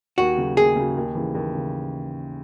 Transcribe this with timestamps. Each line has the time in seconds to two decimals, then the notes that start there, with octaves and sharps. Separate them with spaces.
0.18 D#2 F#4
0.37 C#3 F#3
0.57 D#2 G#4
0.76 C#3 F#3
0.97 D#2
1.15 C#3 E3
1.35 D#2
1.55 C#3